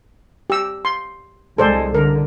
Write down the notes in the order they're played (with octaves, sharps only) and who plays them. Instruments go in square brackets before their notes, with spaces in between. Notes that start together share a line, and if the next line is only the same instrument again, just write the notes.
[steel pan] G4 E6
C6
[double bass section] C2 G#3 [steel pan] A4 C5 D5
[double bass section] D3 [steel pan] A#4